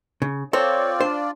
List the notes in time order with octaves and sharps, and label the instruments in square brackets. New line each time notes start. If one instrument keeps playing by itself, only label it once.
[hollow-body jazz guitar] C#3
[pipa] C4 [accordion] F4 D5 [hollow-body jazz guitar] A4 [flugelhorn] C#5
[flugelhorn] D4 [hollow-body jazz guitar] C5